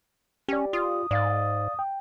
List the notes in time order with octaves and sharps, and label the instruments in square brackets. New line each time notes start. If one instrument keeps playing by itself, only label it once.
[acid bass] C#4 [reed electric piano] G4 D5
[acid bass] F4 [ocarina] D#6
[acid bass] G#2 [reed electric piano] D5 F5 A6
[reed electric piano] G5